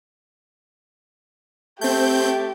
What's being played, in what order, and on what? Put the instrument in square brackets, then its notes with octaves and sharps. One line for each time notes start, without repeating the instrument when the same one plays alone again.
[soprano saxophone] A3 [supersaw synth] C4 G6 [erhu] G4